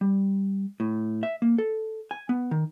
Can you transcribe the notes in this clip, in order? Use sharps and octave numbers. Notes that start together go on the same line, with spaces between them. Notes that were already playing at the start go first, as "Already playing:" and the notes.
G3
A2
E5
A#3
A4
G#5
B3
D#3